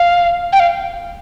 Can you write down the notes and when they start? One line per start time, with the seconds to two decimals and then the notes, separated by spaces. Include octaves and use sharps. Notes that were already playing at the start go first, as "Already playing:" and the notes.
Already playing: F5
0.53 G5
0.60 F5